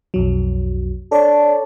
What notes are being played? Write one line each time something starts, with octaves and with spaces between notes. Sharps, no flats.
B1 F2 F#3
D4 A4 C#5 A5